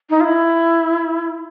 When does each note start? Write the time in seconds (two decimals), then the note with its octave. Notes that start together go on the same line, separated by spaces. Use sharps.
0.10 D#4
0.21 F4
0.24 E4